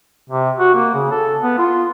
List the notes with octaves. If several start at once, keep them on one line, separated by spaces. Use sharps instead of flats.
C3
F#4
A#3
C#3
A4
B3
F4